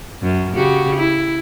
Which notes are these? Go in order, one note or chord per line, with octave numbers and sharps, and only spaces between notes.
F#2
C#3 F#4 G4
E4